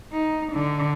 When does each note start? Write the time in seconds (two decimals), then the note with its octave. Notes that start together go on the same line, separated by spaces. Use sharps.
0.13 D#4
0.53 D3